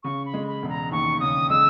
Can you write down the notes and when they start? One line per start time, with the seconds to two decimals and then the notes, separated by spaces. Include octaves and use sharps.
0.03 C#3 C#6
0.25 B5
0.33 G#3
0.47 B5
0.62 E1
0.69 A#5
0.91 D#2 C#6
1.20 C#3 D#6
1.50 G#3 E6